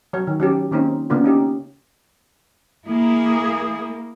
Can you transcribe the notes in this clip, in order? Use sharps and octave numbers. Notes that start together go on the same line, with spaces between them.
F#3 C#5
D#3
F#3 C#4 G4
D#3 A#3 C4 C#4 D#4
C#3 A#3 B3 D4 F4
C#4 D#4 G4
A#3 E4 G#4